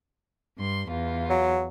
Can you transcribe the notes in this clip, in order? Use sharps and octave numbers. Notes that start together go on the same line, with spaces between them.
G2 C6
E2 F4
F#3